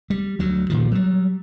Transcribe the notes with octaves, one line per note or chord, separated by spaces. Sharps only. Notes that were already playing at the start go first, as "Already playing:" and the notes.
G3
D2 F#3
A#2 D#3 F3
F#3 G3